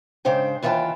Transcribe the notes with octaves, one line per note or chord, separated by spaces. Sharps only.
G#2 C#3 D4 C5 G5
D#2 E3 F4 E5 G5 A5